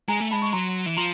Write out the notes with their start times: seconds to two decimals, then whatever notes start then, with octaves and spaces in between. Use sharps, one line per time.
0.08 G#3 G#5 A#5
0.20 A3
0.31 G#3 A5 B5
0.42 C#6
0.53 F#3 A#5 C6
0.86 E3
0.96 F3 A#5 C6